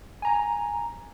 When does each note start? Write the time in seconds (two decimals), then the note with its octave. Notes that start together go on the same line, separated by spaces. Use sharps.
0.22 G#5 A#5